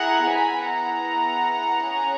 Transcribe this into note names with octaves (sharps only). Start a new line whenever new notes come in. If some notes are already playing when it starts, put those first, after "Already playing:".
Already playing: E4 G#4 F#5 A#5
B3 E4 G#4 G#5 B5
F#5 A#5
G#4
C#4